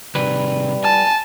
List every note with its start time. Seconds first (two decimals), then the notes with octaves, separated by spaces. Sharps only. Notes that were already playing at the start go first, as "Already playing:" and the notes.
0.15 C3 D#3 G3 B4
0.84 G#5 A5